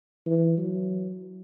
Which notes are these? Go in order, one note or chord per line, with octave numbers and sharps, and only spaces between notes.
E3
F#3